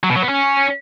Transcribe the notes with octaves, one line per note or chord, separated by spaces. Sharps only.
F#3
B2
F#3
B3
C#4